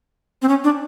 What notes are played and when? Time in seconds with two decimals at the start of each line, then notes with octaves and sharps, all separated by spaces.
0.42 C4
0.49 C#4
0.64 D4